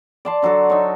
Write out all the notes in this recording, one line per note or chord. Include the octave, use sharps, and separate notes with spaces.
D5 A5 C6
D3 F#3 F#4 A4
D#4 C#5